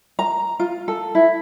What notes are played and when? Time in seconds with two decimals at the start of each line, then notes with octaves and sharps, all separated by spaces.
0.19 A#5
0.59 F4
0.88 A4
1.15 E4